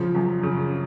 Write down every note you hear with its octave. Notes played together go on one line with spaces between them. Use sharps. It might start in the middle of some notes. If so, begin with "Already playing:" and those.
Already playing: C#3 F3
F#2
C#3